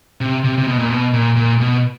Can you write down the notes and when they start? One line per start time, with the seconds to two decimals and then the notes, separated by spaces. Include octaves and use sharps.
0.21 C3
0.44 C3
0.58 C3
0.67 B2
0.79 A#2
0.90 B2
1.13 A#2
1.37 A#2
1.60 B2